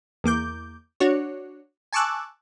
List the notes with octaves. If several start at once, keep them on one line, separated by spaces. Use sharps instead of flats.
E2 A#3 D6 G6
D4 F#4 C#5
G#5 A5 C#6 D6 E6 F#6